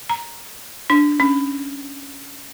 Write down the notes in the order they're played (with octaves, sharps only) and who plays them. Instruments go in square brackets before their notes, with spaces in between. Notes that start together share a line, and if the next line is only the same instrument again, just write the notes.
[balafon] A#5
D4
C#4